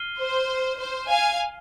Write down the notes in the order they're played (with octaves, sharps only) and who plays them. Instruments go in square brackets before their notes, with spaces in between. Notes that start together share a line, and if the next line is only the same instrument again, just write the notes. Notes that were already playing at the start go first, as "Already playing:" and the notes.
Already playing: [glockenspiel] F6 C7 D#7 G7
[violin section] C5
C5
F5 G#5